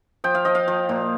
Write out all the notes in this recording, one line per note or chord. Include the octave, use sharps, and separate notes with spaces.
F3 G5
F5
F3 D#5
F5
F3
A#2